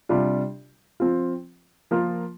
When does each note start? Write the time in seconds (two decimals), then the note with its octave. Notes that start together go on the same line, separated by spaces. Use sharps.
0.09 C3 G3 D4 F4
1.00 F3 C4 F4
1.91 F3 A#3 F4 A#4